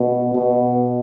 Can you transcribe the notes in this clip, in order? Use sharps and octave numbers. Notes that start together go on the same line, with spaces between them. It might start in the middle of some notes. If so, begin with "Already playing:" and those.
Already playing: B2
B2